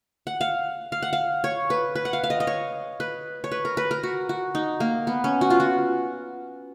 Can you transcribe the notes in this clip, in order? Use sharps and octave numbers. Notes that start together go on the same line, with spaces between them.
F#5
F5
F5
F#5
F5
C#5
B4
B4
F#5
F5
F5
D#5
D#5
C#5
B4
C#5
B4
A#4
B4
A#4
F#4
F#4
D#4
A#3
B3
C#4
F#4
F4
F#4